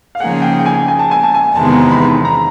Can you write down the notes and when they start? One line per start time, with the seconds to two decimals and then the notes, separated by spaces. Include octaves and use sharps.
0.15 F5
0.20 C#3 F3 A#3 D#4 G#4 F#5
0.42 G5
0.59 G5
0.66 G#5
0.88 G#5
0.99 A5
1.11 G#5
1.23 A5
1.34 G#5
1.56 E2 C3 D#3 G#3 B3 A5
1.73 A#5
1.91 B5
2.07 B5
2.25 A#5